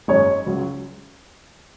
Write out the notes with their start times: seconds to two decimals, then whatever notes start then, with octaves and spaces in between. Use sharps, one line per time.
0.08 F#2 D#3 G#3 C#5
0.46 C#2 C#3 F#3